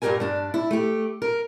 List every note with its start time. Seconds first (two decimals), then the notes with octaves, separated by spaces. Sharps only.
0.02 G2 A#2 F#3 G4 A#4 G#5
0.20 G2 D4
0.54 E4
0.71 A3 G4
1.22 A#4